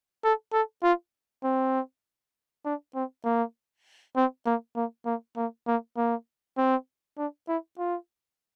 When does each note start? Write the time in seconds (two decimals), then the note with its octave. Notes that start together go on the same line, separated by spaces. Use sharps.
0.24 A4
0.53 A4
0.83 F4
1.43 C4
2.65 D4
2.95 C4
3.24 A#3
4.16 C4
4.46 A#3
4.76 A#3
5.05 A#3
5.36 A#3
5.67 A#3
5.97 A#3
6.57 C4
7.17 D4
7.48 E4
7.78 F4